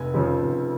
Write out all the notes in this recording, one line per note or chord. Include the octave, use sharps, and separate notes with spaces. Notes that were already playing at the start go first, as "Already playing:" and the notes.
Already playing: F1 G#5
F2 C#3 F3
F1